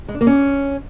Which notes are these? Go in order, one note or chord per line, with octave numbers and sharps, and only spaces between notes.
G#3
D4
A#3
C#4